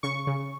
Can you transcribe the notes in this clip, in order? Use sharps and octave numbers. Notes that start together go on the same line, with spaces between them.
C#3 C#6
C#3